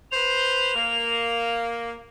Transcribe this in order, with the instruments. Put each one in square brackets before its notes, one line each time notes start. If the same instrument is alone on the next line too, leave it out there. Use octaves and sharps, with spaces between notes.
[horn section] B4 C5 [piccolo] F7
[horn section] A#3